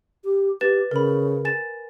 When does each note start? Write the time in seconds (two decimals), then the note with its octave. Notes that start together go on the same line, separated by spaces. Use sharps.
0.24 G4
0.61 G4 B4 A6 E7
0.91 C#3 A#4 B5
1.45 G#5 A6 E7